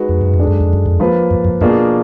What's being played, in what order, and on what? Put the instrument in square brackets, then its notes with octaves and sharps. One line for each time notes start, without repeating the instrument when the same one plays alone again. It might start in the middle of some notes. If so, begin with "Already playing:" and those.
Already playing: [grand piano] G#3 D#4 F#4 B4
[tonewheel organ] F2
F#2
F2
[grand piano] D3 G#3 D4
[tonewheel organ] F#2
F2
F#2
F2
[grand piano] F3 A#3 F4 B4
[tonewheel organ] F#2
F#2
[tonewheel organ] F#2 [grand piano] B2 A#3 D4 F4 G#4